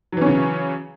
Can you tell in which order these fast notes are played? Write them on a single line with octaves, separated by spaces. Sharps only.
F#3 E3 C#4 C#3